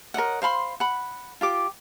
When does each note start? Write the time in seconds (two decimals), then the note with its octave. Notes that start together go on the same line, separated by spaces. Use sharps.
0.14 A#4 C#5 D#5 F#5
0.42 C5 F5 B5 C6
0.80 F#5 B5
1.41 F4 G4 D6